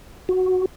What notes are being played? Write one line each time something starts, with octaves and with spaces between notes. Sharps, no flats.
F#4